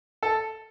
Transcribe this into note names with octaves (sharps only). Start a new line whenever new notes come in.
A4